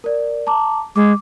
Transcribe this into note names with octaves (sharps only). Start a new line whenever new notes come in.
A#4 D5
A5 A#5 D6
G#3 D6